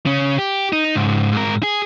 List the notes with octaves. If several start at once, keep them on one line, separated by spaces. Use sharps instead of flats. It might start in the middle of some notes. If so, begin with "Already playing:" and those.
C#3 C#4
G4
D#4
C#2 G#2
G#2 A#4
G#4